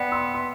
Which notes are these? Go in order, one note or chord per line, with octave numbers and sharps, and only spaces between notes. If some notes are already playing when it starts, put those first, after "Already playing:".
Already playing: B3 D5 F#5 G5
C6 E6
C6